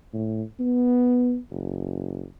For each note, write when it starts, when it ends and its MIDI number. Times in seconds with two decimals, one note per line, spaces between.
0.13 0.42 45
0.60 1.37 59
1.51 2.24 30